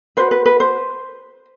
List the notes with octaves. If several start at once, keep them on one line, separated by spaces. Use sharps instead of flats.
F#4 B4 C5
B4
B4
C5